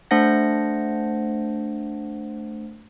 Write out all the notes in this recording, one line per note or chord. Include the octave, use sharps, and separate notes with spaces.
A3 D4 C5 F#5 A#6